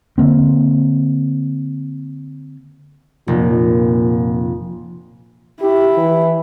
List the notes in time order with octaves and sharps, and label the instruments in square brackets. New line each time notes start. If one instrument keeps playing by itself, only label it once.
[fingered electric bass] D3 F#3 A#3 C4
[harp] F1 [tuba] A#2
[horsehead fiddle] E4 [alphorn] G4
[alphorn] E3